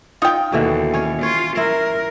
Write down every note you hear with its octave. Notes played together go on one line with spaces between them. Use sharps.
D#4 F4 G5
D#2 B2 D3 E3
C#4 C#5
F4 C#5
E4 A#4